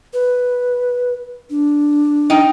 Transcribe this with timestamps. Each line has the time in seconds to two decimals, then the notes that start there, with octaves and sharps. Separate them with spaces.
0.13 B4
1.50 D4
2.30 D#4 G5